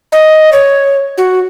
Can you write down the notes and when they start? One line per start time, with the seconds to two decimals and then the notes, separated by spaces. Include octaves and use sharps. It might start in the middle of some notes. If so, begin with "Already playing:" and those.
0.12 D#5
0.53 C#5
1.18 F#4